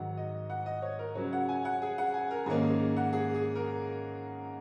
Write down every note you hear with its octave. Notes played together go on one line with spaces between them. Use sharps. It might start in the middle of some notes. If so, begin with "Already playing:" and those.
Already playing: G#2 D#3 F#3 F#5
D#5
F#5
D#5
C#5
A#4
C#3 F#3 C#4 C#5
F#5
G#5
F#5
G#4
F#5
G#5
A#4
G#2 D#3 A#3 C#4 G#4
G#4
F#5
G#4
G#4
A#4